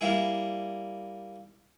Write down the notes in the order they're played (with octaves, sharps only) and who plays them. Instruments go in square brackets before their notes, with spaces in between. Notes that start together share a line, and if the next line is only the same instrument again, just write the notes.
[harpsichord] G3 A#3 E4 G#4